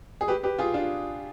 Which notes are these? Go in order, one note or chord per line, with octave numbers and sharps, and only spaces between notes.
G#4
G4 B4
G4 B4
F4 G#4
D4 F4